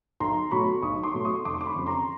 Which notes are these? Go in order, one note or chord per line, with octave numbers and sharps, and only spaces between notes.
B1 A#5 C6
B2 F#3 A3 B5 C#6
B1 C#6 D#6
C6 D6
B2 F#3 A3
C#6 D#6
F1 C6 D6
D6
B5 C#6
F2 C#3
A#5 C6